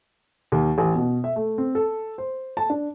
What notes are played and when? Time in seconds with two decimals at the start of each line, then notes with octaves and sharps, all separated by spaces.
0.52 D#2
0.78 A1
0.95 B2
1.24 E5
1.36 A3
1.58 C4
1.75 A4
2.18 C5
2.57 A5
2.70 D4